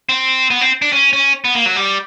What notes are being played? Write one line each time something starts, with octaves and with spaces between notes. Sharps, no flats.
C4
B3
C4
D4
C#4
C#4
B3
A#3
F#3
G3